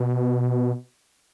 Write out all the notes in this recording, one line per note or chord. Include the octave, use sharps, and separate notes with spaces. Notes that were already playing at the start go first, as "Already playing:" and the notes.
Already playing: B2